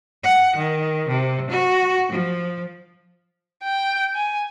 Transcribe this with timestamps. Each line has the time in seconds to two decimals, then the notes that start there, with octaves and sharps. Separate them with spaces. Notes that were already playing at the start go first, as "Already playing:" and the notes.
0.24 F#5
0.56 D#3
1.08 C3
1.51 F#4
2.12 F3
3.64 G5
4.15 G#5